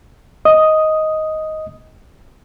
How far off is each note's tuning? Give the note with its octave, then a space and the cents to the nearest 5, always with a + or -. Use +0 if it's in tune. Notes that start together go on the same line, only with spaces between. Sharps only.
D#5 +10 D#6 +0